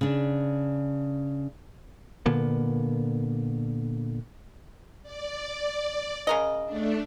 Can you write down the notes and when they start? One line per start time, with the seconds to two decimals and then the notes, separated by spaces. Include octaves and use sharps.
0.01 C#3 D4
2.26 A#2 D3 A#3 B3
5.03 D5
6.27 C#3 A#4 D#5
6.65 A3 D4